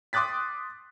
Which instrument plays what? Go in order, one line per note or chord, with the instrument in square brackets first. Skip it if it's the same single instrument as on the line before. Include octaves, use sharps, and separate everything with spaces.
[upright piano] C6 D6 D#6 F#6 A6 B6